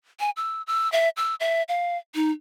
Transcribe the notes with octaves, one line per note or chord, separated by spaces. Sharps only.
G#5
E6
E6
E5
E6
E5
F5
D#4